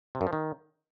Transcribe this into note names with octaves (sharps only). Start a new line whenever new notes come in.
C3
F#2
F3
D#3